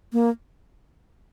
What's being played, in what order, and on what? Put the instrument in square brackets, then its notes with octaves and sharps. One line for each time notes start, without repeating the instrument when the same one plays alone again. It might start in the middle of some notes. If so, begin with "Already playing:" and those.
[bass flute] A#3